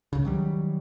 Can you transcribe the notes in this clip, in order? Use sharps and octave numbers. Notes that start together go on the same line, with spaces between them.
C#2 C#3
D#3 F#3 G3